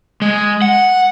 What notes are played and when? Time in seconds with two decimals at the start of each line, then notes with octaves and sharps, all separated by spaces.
0.22 G#3
0.62 F#5